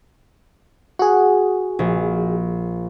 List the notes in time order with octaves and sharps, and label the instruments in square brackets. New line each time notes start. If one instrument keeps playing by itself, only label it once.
[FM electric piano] F#4 G#4 [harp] F#5
[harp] A#1